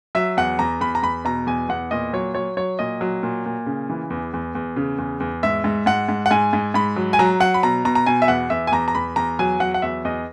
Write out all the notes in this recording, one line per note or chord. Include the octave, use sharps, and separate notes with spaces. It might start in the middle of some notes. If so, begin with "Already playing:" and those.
F#3 E5
E2 F#5
E2 A#5
E2 B5
A#5
E2 B5
B2 A#5
E2 G#5
E2 F#5
A#2 D#5
F#3 C#5
F#3 C#5
F#3 C#5
A#2 D#5
F#3
A#2
A#2
C#3
E3
E2
E2
E2
C#3
E2
E2
G#2 E5
G#2
G#2 F#5
G#2
F#5
G#2 G#5
G#2
G#2 B5
F#3
G#5
F#3 A#5
F#3 F#5
B5
B2 A#5
B2 A#5
A#5
B2 G#5
E5
E2 F#5
E2 E5
G#5
E2 A#5
A#5
E2 B5
E2 A#5
F#3 G#5
F#3 F#5
F#5
E2 E5
E2 D#5